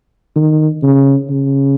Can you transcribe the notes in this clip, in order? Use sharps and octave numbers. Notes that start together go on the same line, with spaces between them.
D#3
C#3
C#3